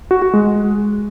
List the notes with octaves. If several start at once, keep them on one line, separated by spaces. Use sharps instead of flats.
F#4
F#4
G#3